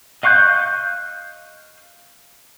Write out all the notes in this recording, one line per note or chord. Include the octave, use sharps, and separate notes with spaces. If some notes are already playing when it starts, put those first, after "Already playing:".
D#5 F5 C#6 F#6 G6